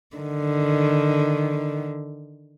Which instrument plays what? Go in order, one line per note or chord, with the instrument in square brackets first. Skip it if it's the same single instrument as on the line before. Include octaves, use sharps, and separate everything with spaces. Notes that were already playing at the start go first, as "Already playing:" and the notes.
[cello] D3 D#3